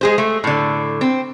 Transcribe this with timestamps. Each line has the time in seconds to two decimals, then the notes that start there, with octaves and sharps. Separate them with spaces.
0.01 G#3 G#4 C5
0.18 A3
0.44 A2 D3
1.01 C4